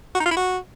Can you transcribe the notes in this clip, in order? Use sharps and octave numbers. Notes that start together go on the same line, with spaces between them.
F#4
D#4
F4
E4
F#4